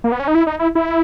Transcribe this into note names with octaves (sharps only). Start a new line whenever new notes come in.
A#3
B3
C#4
D#4
E4
D#4
E4
E4